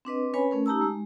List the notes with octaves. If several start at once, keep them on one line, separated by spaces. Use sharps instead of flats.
C4 D4 B4 D#5
C#4 B4 C#5 G#5 B5
A3 C#4 A#4
D#4 G4 A5 A#5 E6
G#3